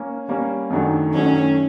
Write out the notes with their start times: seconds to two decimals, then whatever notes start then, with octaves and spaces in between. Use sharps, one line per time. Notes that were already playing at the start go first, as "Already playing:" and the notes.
Already playing: A#3 C#4
0.28 G3 A#3 C#4
0.70 F#2 D#3 F#3 A3 D4
1.14 F#2 D#3 F#3 A3 C#4 D4